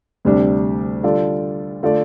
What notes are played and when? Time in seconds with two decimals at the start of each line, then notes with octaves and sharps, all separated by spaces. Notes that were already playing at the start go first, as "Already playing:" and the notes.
0.25 D2 C3 G3 D4
1.03 D3 G3 F4 A4 D5
1.83 D3 A3 F4 A4 D5